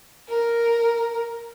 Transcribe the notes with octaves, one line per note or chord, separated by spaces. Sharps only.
A#4